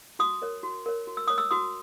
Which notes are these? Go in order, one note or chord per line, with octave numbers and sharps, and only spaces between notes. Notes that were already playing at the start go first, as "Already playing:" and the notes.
F#4 D#6
A#4 C#5
F#4
A#4 C#5
F#4
E6
A#4 C#5 D#6
E6
F#4 D#6